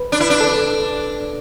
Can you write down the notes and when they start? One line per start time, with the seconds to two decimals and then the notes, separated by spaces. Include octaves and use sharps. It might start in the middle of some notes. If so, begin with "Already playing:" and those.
Already playing: B4
0.12 D4
0.20 E4
0.30 D4
0.41 A4